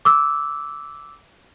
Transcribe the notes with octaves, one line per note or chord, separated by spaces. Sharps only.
D6 E6